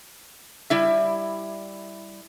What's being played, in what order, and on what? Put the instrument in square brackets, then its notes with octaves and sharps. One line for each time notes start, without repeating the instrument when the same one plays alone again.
[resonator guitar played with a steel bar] G3 E4 E5